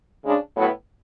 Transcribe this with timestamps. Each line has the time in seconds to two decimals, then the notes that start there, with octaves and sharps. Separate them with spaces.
0.24 C#3 G#3 D4
0.55 A2 F#3 B3 E4